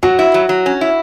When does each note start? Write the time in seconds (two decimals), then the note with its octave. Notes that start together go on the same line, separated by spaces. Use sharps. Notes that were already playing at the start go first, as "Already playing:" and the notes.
0.03 F#3 F#4
0.19 E4
0.34 F#3
0.49 F#3
0.66 C#4
0.81 E4